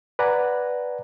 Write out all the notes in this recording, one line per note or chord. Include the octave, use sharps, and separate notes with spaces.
B4 D5 F#5 G#5 A#5